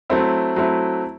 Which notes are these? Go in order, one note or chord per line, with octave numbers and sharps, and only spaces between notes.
F#3 A3 C4 E4
F#3 A3 C4 E4